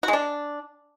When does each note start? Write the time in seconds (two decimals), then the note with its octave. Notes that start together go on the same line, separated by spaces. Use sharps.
0.03 F#4
0.08 G#3
0.13 D4